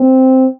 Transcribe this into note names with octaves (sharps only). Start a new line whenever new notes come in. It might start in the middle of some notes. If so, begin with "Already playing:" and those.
Already playing: C4